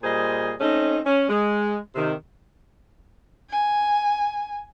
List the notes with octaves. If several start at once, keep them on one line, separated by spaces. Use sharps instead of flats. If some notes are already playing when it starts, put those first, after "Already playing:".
A#2 G3 G#4 C5 D#5
A3 C4 C#4 D#4
C#4
G#3
C3 D#3
G#5